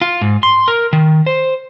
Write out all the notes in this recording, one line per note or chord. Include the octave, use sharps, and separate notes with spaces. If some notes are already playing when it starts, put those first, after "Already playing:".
F4
G#2
C6
A#4
D#3
C5